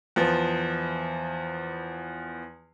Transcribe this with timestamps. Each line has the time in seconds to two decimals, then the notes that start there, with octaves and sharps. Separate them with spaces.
0.16 E2 F3 B3